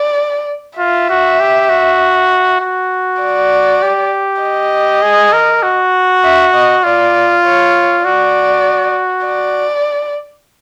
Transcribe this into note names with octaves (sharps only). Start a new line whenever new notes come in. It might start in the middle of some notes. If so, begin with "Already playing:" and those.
Already playing: D5
F4 E5
F#4
G4
F#4
F#4
D5
G4
D#5
G#4
A#4
F#4
E5
D#5
F4 D5
C#5
F#4 D5
D5